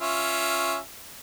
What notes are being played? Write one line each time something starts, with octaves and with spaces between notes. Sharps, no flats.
C#4 F4 E5